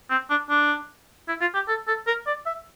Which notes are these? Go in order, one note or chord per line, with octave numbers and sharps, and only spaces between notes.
C4
D4
D4
E4
F4
G4
A4
A4
A#4
D5
E5